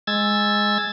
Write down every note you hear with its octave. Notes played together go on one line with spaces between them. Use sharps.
G#3 E6 G#6 A6